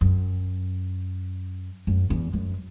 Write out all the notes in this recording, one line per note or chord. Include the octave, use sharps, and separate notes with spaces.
F#2
F#2
E2
F#2